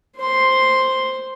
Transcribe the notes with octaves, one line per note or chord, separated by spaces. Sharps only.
C5 C6